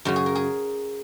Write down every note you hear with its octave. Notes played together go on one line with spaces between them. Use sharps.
F#2 C#3 F#3 F#4
G#4
A#4
G#4